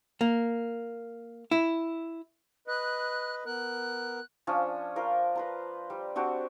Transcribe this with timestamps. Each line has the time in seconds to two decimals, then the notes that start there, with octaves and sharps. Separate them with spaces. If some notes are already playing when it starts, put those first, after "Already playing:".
0.21 A#3
1.51 E4
2.68 B4 D#5 F#6
3.45 B3 A#4 F#6
4.47 F3 C#4 D4
4.96 F4 A#4 C5
5.35 B4 C5 A#5
5.90 G3
6.15 C4 D4 F#4 G4